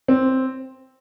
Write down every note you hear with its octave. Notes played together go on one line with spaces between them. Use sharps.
C4